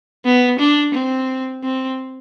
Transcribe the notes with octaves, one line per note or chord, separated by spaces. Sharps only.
B3
D4
C4
C4